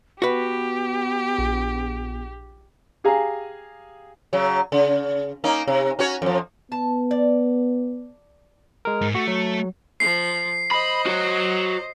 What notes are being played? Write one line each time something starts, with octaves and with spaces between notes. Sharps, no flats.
B3 F#4 G4 B4
A#1
G4 G#4 F5 G#5 A#5
C#3 F#3
C#3
A#3 C#4 D#4
C3
C#4 F#4 C#5
F2 F3
B3 A5
D5
G#3 A#4
G#2
A3 F#4
F#3
F3 C7
C5 D#5 B5
F#4 C#5